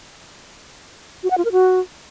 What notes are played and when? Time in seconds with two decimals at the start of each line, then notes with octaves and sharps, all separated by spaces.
1.23 F#4
1.31 F#5
1.38 F4
1.45 A#4
1.52 F#4